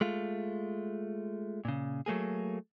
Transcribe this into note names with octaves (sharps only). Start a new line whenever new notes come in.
G#3 A3 F4
A#2 C#3
F#3 A3 A#3 G#4